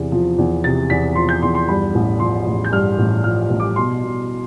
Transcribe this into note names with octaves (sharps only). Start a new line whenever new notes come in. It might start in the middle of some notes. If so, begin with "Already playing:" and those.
Already playing: E2 C3
F3
E2
C3 A6
E2 B6
F3 C6
G6
E2 C6
C6
G2 B5
A1
F3 C6
A1
G6
G2 F6
A1
F3 F6
A1
D6
B2 C6
B2